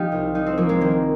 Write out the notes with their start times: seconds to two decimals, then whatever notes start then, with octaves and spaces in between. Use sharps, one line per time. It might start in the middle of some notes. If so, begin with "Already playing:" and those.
Already playing: F3 D#4 F4 G4
0.12 C2
0.35 F3 D#4
0.46 C4
0.58 F3 A#3
0.69 G#3
0.81 D#3 A#3